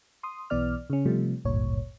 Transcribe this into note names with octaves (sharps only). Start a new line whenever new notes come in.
C6 D#6
B1 E3 B3 D5 F6
C#3 C#4
C3 F3 G3 A3
G#1 D2 G2 A#2 C#5